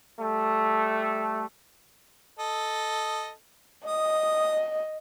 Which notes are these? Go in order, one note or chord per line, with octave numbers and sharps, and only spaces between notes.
G3 A3
A4 D#5
D#5 D#6